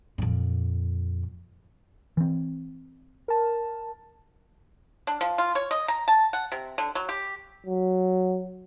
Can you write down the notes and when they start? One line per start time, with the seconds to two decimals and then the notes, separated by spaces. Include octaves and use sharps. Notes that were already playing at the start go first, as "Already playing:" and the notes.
0.18 F2 A#2
2.17 E3 C4
3.28 A#4 A5
5.07 D4
5.21 F3
5.38 F4
5.55 C#5
5.71 D#5
5.88 A#5
6.08 A5
6.33 F#5
6.52 C3
6.78 D3
6.95 F#3
7.09 G4
7.66 F#3